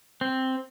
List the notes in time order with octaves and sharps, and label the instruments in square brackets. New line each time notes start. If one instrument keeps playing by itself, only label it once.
[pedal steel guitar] C4